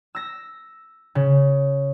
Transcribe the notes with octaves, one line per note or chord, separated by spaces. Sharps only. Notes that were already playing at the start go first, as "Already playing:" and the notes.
E6 A#6
C#3